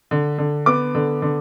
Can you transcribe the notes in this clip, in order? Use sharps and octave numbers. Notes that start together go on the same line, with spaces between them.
D3
D3
B3 D6
D3
D3